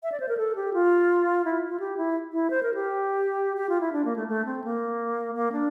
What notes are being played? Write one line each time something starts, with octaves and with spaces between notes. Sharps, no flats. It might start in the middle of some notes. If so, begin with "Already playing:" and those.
E5
D5
C5
A#4
A4
G4
F4
E4
F4
G4
E4
E4
C5
A#4
G4
G4
F4
E4
D4
A#3
A3
A3
C4
A#3
A#3
D4